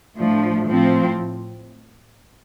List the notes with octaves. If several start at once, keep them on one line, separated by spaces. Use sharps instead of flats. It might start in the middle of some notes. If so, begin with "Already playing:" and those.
A2 F3 A3 D4
A2 F3 C4